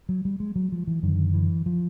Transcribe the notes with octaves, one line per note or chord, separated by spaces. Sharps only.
F#3
G3
G#3
F#3
F3
E3
F#2 D3 D#3
E3
F3